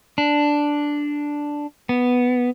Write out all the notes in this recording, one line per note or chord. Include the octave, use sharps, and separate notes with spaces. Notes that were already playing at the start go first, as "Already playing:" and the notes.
D4
B3